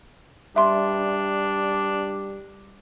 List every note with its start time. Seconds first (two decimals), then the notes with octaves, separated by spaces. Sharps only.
0.56 G3 D4 E5 C6